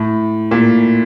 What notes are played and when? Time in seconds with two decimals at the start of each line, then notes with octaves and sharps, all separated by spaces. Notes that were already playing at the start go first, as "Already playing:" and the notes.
Already playing: A2
0.51 A#2